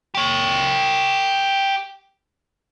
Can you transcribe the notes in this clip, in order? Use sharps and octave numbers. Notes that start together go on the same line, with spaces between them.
G4 C#5